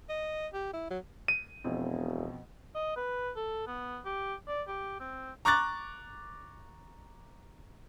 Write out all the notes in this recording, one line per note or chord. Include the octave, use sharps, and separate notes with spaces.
D#5
G4
E4
F#3
D#7
E1 F2 B2 C4
D#5
B4
A4
B3
G4
D5
G4
C4
A#5 C#6 D6 F#6 A6